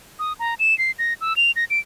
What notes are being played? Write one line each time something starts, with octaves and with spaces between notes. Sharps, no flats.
D#6
A#5
E7
C7
A#6
E6
F7
A#6
D7